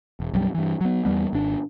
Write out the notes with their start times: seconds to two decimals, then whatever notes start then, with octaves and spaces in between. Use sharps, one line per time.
0.20 E1
0.33 B1 F#2 G3
0.54 G2 E3
0.81 F#3 B3
1.05 E2 G2 G3 B3
1.33 G#1 D4